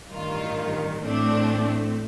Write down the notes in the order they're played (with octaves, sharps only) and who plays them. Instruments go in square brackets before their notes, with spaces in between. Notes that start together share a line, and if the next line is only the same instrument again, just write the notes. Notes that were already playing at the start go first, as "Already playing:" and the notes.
[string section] A1 G2 D#3 F4
A1 A2 A3 C4 D4